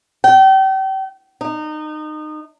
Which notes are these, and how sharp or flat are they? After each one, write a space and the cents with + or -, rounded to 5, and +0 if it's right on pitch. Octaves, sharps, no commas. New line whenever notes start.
G5 -35
D#4 -25